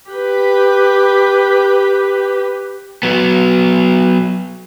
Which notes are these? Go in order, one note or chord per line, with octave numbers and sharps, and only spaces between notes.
G4 B4
F#3 B3